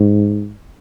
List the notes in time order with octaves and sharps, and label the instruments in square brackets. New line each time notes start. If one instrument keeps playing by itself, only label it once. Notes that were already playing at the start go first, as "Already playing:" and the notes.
Already playing: [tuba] G#2